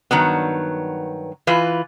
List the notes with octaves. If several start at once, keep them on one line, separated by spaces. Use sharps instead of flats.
G2 D#3 F#3 B3
E3 F4 B4